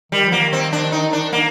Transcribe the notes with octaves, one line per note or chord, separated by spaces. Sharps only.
D#3 G3
F3
A#3
D#3
C4
D4
D#4
D4
A#3